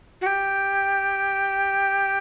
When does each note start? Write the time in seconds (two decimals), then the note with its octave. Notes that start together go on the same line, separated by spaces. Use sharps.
0.21 F#4
0.26 G4